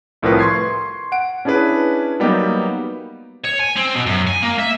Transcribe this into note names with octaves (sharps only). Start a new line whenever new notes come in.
C2 A2 F3 A#4 B4
C6 C#6 G#6 C7
F#5 D7
C#4 D4 E4 G#4 B4
F#3 G3 A#3 B3 D#4 G4
C#5
G#5
C4
B2
F#2
G#5
A#3
E5